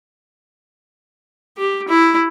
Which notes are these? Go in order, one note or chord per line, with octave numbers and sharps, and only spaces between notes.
G4
E4